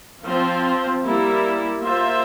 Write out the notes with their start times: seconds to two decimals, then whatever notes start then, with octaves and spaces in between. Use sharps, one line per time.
0.24 F3 C4 F4 C5
1.04 G3 A#3 E4
1.81 A#3 F4 C5 E5